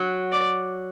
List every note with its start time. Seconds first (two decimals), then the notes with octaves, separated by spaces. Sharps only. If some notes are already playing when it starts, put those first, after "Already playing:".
Already playing: F#3
0.32 D5